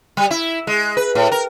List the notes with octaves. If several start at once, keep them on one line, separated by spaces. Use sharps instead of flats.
G3
E4
G#3
B4
A2
A#4